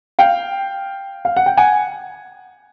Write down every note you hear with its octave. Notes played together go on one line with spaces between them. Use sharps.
F5 G5
F5
F#5
G5
F#5 G#5